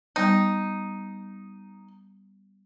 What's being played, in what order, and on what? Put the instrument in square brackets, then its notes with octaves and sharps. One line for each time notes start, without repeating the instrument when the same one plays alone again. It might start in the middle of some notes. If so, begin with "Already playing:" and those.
[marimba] G3 B3 [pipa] D#4